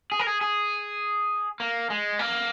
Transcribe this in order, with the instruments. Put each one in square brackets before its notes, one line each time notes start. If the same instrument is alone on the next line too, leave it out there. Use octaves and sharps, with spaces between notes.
[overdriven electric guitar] G#4
A#4
G#4
G#4
A#3
G#3
A#3